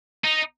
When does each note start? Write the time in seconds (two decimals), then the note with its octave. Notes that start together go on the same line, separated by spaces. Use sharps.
0.24 D#4